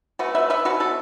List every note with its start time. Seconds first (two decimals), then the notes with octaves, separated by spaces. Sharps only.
0.19 A3 F#4 B4
0.35 B4 E5
0.43 A3
0.50 B4 E5
0.65 B2 F#4 B4
0.80 E4 A4